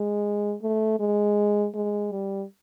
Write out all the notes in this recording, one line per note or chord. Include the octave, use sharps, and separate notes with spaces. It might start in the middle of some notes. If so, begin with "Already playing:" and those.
Already playing: G#3
A3
G#3
G#3
G3